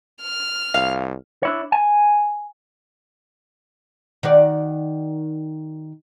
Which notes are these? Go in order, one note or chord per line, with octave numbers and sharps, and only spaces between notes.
F6
C2 F5
D4 E4 C#5
G#5
D#3 F#4 D5